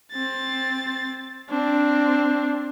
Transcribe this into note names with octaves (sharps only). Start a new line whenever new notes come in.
C4 A6
C4 D4